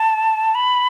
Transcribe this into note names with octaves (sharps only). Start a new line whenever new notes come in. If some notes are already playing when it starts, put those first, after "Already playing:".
Already playing: A5
B5